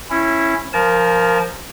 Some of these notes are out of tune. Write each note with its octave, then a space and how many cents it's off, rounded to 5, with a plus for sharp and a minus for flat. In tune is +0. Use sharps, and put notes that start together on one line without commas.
C#4 -20 E4 +0
F3 +0 A#4 +0 A5 -40